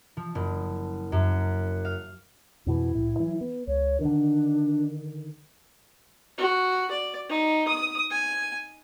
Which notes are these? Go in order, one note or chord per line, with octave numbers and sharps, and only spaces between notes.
F3
F#1
F#2
F5
F2 B2 E3 E4
C2 A2
E3 F#3
B3
C#2 C#5
D3 D#3 D4
F#4
D5
D#4
D#6
G#5